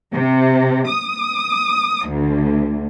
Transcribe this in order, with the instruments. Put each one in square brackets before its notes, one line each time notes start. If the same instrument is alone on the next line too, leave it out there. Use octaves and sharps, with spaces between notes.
[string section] C3
D#6
D2